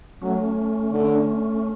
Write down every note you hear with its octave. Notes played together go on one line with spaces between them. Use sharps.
F#3 A3 C#4
D3